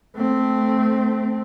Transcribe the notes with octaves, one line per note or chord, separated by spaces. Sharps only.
A3 C4